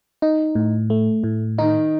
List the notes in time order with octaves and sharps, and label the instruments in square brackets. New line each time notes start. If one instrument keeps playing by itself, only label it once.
[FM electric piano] D#4
A2
A3
A2
[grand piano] D#3 [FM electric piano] D#4